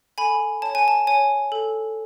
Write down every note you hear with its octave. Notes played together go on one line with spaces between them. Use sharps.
A4 G#5 B5
C#5 A5
G#5
A5
C#5 G#5
A4